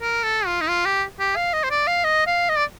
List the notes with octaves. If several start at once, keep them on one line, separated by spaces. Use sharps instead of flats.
A#4
A4
F4
D#4
F4
G4
G4
F5
D#5
C5
D5
F5
D#5
F5
D#5
D5